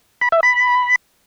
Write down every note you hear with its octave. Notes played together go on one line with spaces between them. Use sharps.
B5
E5
B5